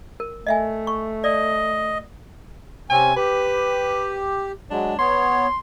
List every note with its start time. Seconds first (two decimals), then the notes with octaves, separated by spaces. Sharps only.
0.20 A#4
0.47 A3 D#5 E5 G#5
0.87 C#6
1.24 D5 D#5
2.90 C3 C4 C#4 G#5
3.16 G4 B4
4.70 F#3 G#3 D4
4.98 B3 C#5 C6